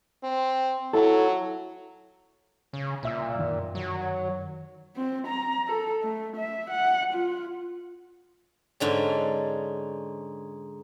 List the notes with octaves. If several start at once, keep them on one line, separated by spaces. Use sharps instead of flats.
C4
F#3 E4 A4
C#3
C2 A#2 E5 E6
F#2 D#3
F#3
C4
A#5
A4
A3
E5
F#5
F4
G#2 D3 C#4